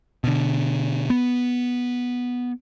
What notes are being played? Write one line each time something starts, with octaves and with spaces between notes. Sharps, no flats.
B2 D3
B3